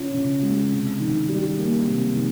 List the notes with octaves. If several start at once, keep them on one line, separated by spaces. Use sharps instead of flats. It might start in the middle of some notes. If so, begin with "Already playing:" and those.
Already playing: C#3 C#4 F4
C#3
G#3
C3
D#3
G3
A#3
C3
D#3